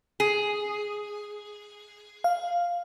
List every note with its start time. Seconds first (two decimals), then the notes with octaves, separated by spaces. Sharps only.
0.20 G#4
2.24 F5